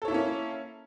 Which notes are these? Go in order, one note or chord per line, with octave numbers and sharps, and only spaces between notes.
A#3 C#4 E4 A4 C#5